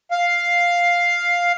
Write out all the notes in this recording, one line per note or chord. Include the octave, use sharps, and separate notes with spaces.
F5